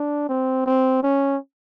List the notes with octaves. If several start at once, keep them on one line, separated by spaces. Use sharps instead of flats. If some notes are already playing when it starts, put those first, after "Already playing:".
Already playing: D4
C4
C4
C#4